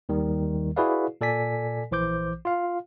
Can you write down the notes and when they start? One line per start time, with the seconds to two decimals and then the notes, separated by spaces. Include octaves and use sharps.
0.09 D#2 D#3 G3
0.76 E4 F#4 G#4 B4 D5 F5
1.21 A#2 A4 D5 G#5 B6
1.91 A#1 E3 C5 D6 G6
2.45 F4 F5